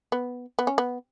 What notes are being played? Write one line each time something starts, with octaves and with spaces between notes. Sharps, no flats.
B3
B3
C#4
B3